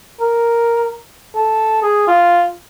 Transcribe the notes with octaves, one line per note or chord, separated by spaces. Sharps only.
A#4
A4
G#4
F4